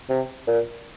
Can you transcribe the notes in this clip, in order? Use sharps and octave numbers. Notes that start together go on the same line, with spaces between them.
C3
A#2